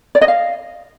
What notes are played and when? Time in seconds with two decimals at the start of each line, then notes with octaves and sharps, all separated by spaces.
0.15 D5
0.21 D#5
0.28 F5